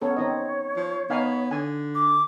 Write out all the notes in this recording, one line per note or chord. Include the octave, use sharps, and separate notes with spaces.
B3 C#4 A4 C#5
C4 D#4 D#5
F3
B3 D#4 F5 G#5
D3 G#5
D6